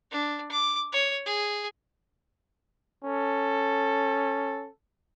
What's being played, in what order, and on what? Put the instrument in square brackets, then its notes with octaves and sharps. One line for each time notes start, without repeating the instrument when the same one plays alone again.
[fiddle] D4
D6
C#5
G#4
[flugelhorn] C#4 [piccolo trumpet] A4